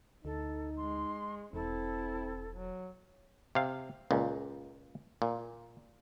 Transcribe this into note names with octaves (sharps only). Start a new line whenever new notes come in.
D2 D#4 A4
G#3 C6
E1 C4 E4 A4
F#3
C3 F5
C#2 A#2
A#2